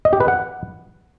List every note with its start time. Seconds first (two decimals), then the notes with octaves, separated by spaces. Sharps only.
0.05 D#5
0.13 G4
0.20 B4
0.28 F#5